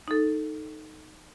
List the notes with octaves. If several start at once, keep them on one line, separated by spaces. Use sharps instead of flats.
D#4 A4